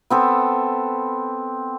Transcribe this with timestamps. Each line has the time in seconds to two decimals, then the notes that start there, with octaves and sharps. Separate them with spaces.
0.10 B3 C4 A4